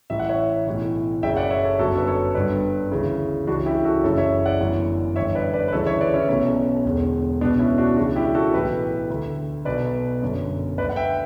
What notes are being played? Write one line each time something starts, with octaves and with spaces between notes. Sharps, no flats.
A1 A2 E3 E5
F#5
C#5 E5
B1 A2 E3
F#1 F#2 C#3 E5 G5
D5 F#5
C#5 E5
A4 C#5
G1 F#2 D3 F#4 A4
B4
A4 C#5
G1 G2 D3 B4 D5
D2 C#3 E3
C#2 C#3 E3 D4 F#4
E4 G4
F#4 A4
F#1 F#2 C#3 E3 A4 C#5
C#5 E5
D5 F#5
G1 F#2 E3
A1 G2 D3 C#5 E5
B4 D5
B4 D5
B4
D2 C#3 E3 A4 C#5
C#5 E5
B4 D5
C#4 E4
B1 B2 A3 C#4
E1 E2 D3
C#2 B2 B3 D4
C#4 E4
D4 F#4
C#2 C#3 E3 D4 F#4
E4 G4
G4
F#4 A4
B1 A2 E3 G4 B4
D2 D3
B1 B2 B4 D5
G1 F#2 D3
D2 D3 B4 D5
F#5
E5 G5